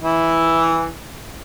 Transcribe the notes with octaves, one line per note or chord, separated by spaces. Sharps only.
E3 E4